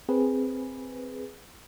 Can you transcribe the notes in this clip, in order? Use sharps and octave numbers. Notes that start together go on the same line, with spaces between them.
C4 G#4 B4